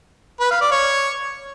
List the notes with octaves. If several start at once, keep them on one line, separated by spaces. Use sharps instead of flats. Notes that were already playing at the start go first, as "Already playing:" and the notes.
B4
F5
D5
C#5